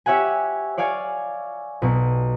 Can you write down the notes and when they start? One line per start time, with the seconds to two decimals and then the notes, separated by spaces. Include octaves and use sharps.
0.06 G4 C#5 E5 F#5 G#5
0.77 C#5 D5 F5 G#5
1.82 B1 B2